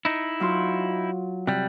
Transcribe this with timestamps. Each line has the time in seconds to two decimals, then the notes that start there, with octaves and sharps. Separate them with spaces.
0.05 D#4 E4
0.40 F#3 F4 C6
1.47 C3 G3 F#6